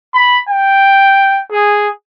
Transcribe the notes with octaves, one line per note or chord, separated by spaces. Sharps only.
B5
G5
G#4